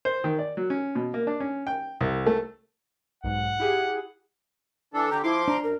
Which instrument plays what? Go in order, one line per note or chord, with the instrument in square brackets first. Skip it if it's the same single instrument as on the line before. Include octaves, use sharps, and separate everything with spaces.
[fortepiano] C5
D#3
D5
F#3
C#4
B2
A#3
D4
C#4
G5
C2
A3
[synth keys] B1 G#2 [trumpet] F#5
[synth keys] E4 G4 G#4
[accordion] E3 D4 A4
[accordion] D3 G4 [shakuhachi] A#5
[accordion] F3 C6 D6 [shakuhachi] E4
[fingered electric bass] D4 [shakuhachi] A#5
[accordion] F#2 [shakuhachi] A#4